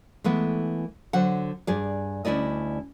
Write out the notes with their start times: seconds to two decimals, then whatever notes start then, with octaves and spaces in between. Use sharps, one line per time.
0.24 E3 G#3 A3 B3
1.13 D3 F#3 C5 F#5
1.67 G2 G#4 D5
2.25 D2 C#4 E4 D5 D#5